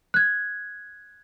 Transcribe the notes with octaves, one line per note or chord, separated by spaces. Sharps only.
F#6 G#6